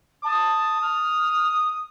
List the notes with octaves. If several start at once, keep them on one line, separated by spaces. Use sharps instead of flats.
A5 D#6
F6